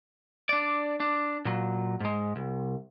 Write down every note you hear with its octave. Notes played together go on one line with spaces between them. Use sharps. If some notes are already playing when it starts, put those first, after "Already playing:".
D4 D5
D4
A#2 F#3
G#2 G#3
C2